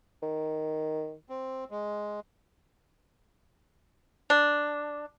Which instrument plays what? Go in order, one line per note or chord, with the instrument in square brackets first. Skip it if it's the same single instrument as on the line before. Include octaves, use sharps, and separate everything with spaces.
[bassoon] D#3
[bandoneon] C4
G#3
[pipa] D4